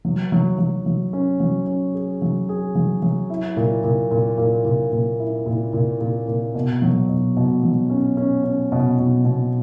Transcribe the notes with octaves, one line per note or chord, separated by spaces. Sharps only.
F#3
F#3
F#3
F#3
C#4
F#3
C#4
G#4
F#3
G#4
F#3
F#3
E4
A#2
A#2
A#2
A#2
A#2
A#2
E4
A#2
A#2
A#2
A#2
B2
F#3
B2
B2
F#3
C#4
C#4
C#4
B2
B2
B2